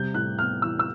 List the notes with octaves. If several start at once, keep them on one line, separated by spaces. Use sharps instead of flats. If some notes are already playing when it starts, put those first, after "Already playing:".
Already playing: C3 G3 G6
A2 F#6
B3 F6
E3 E6
E6